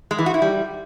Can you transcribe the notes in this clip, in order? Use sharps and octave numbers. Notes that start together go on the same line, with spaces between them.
G#3
E3
F#4
E4
G3